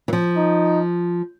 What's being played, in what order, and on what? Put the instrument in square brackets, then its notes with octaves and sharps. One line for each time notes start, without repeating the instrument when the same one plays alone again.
[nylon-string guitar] E3
F3
[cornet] D#4